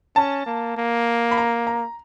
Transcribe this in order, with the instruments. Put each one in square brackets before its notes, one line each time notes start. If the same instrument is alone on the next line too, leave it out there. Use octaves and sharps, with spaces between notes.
[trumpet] C#4 [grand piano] A5
[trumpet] A#3
A#3
[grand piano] B5
A#5
A#5